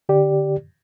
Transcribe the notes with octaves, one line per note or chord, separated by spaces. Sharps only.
D3 G4 D5